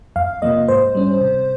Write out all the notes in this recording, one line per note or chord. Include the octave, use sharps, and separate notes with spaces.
F2 F5
C3 F3 A#3 D#5
G#2 C5
G3 C#4
C3